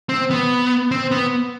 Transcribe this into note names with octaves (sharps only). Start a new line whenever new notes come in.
C4
B3
C4
B3